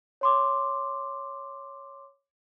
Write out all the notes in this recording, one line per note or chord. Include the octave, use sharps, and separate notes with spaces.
C#5 C6 D6